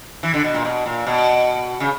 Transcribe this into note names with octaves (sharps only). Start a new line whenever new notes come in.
E3
D3
B2
A#2
B2
A#2
B2
C#3